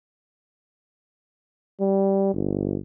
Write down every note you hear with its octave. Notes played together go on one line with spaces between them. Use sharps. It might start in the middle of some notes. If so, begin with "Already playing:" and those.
G3
G1